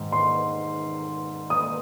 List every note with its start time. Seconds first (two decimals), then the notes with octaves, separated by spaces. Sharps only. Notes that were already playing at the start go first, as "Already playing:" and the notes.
Already playing: G#2 D#3
0.12 C6
1.50 D#6